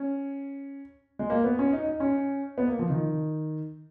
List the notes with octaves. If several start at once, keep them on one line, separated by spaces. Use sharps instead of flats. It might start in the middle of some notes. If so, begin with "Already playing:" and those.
Already playing: C#4
G#3
A#3
B3
C#4
D#4
D#4
C#4
B3
A#3
F3
D#3